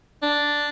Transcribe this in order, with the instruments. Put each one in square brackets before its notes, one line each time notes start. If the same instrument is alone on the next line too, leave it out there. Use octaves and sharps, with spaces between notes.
[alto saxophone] D4